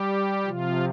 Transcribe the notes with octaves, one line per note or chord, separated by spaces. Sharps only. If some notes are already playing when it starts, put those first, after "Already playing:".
Already playing: G3 G4
C3 F3 F4